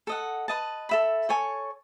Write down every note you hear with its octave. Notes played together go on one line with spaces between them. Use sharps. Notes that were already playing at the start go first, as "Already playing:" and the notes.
A4 D#5 F#5
B4 D#5 A5
A4 E5 B5
A4 C#5 G#5 C#6